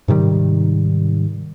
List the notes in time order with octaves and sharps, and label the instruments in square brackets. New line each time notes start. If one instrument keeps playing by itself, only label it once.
[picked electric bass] G#2 C3 D#3 G3